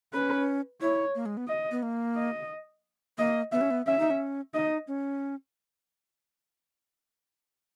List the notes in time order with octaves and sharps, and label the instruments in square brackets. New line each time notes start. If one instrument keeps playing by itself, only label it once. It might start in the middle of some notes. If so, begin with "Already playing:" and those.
[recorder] C#4 [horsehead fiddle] B4
[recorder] E4 [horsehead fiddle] C#5
[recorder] A#3
G#3
B3
[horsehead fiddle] D#5
[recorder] B3
A#3
[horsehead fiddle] D#5
[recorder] A#3 [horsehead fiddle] D#5
[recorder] B3 [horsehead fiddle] E5
[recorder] C#4
B3
[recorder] C#4 [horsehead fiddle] E5
[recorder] D#4
C#4
[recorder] D#4 [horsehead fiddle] D#5
[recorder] C#4